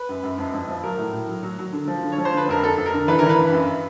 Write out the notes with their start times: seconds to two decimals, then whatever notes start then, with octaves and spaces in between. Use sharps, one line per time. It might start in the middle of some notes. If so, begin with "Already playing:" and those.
Already playing: B4
0.09 F#2
0.23 F#2
0.38 F2
0.54 F2
0.68 F3
0.84 F#3 A#4
0.98 A2
1.13 A2
1.28 F#3
1.43 F#3
1.58 F#3
1.73 D3
1.88 F3
2.03 D3
2.12 C#5
2.18 F3
2.25 C5
2.33 D3 B4
2.49 F2 A#4
2.64 F2 A4
2.78 F2
2.86 A#4
2.93 D3
3.08 E3 B4
3.19 E3 A#4
3.29 B4
3.38 G2
3.53 F#2